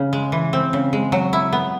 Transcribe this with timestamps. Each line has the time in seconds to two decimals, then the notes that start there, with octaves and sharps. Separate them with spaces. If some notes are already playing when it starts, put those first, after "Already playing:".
Already playing: C#3
0.13 G#3
0.32 E3
0.53 C4
0.73 C#3
0.93 G#3
1.12 F#3
1.33 E4
1.53 B3